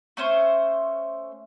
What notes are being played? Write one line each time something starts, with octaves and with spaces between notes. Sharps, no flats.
A3 C#4 C5